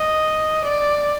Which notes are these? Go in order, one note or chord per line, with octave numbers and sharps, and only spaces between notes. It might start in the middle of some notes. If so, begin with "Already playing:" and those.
Already playing: D#5
D5